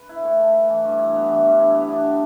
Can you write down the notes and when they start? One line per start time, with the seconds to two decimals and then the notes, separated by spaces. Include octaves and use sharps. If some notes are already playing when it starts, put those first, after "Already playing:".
Already playing: B4
0.09 E4
0.24 A3
0.39 A3
0.54 B4
0.69 E3
0.84 G2
0.99 E4
1.15 B3
1.28 E3
1.44 G2
1.59 E4
1.75 B3
1.89 D4
2.04 G3